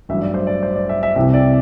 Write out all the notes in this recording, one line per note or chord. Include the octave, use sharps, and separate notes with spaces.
A1 G2 F#3 E5
D5
C5
D5
C5
D5
E5
E5
C2 C3 E3 E5
D5